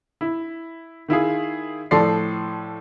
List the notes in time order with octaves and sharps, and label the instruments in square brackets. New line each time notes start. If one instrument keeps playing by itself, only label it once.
[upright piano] E4
D#3 E4 F4 G#4
A2 F3 A4 D5 C6 C7